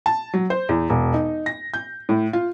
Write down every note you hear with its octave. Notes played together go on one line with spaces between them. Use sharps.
A5
F#3
C5
E2
E1
D#4
A#6
G6
A2
F4